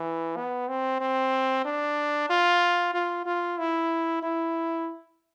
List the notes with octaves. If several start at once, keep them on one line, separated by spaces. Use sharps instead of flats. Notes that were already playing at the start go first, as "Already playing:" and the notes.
Already playing: E3
B3
C4
C4
D4
F4
F4
F4
E4
E4